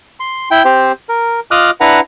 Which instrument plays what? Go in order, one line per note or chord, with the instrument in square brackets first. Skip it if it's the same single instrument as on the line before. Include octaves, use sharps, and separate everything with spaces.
[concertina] C6
E4 G5
C4 G4 C5
A#4
F4 D#5 D6 D#6 F6 F#6
D4 E4 B4 F#5 A#5